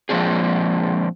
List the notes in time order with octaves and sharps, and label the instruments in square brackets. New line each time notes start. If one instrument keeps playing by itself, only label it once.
[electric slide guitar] A#2 F3 G#3 C4 D4 G#4